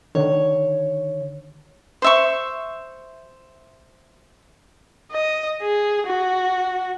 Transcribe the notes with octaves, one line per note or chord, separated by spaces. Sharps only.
D3 D#3 C#5
C5 E5 C#6
D#5
G#4
F#4